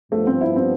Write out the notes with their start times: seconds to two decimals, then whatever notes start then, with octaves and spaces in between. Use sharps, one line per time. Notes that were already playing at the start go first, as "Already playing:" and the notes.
0.12 G2 F3 A3 B3
0.27 C4
0.41 E4
0.56 C4